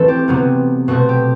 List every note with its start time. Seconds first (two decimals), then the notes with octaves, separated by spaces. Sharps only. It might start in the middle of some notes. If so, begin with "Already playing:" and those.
Already playing: E3 A3 C4 A4 B4
0.08 G4
0.28 C3 F#3 B3
0.88 B2 A3 C4 F#4
1.09 G4